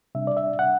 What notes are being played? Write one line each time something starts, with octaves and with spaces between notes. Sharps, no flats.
C3 G3 D4 E5
D5
E5
F#5